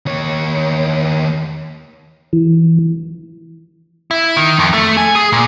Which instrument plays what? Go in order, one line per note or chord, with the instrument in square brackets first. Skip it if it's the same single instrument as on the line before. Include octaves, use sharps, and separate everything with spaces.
[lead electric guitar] D#2 C#5
[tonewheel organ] E3
[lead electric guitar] E4
D#3
F2
A3
G#5
G#4
A#2